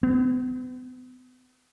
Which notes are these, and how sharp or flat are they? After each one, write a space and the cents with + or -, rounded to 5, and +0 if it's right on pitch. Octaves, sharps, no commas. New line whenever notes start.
B3 +40